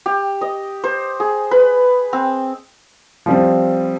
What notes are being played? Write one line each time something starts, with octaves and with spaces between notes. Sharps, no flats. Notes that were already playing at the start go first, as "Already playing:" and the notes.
G4
D#5
C5
G#4
B4
C4
F3 G3 C4